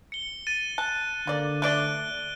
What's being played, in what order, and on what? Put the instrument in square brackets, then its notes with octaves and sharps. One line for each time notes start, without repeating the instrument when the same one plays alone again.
[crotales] C#7 G7
A6 D#7
[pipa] A5 [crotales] F#6
[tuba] D3 [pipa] A#3 D5
[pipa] A3 D4 D5 [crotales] F#6 D7 G7